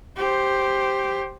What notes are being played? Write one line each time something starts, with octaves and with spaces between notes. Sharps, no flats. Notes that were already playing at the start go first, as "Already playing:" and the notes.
G4 C5